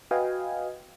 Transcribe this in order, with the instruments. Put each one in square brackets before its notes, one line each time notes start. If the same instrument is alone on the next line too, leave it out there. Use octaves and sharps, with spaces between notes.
[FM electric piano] F#4 B4 D#5 F5 G5 G#5